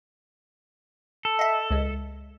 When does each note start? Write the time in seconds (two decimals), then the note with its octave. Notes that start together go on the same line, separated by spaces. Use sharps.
1.25 A4
1.39 D#5 E5
1.70 C#2 G#3